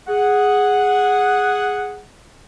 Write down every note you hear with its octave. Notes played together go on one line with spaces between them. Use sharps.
G#4 F#5